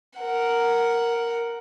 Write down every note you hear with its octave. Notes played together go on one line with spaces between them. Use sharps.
A#4 F#5